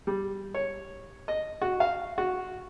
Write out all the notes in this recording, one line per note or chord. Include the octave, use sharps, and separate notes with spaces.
G3
C#5
D#5
F#4
F5
F#4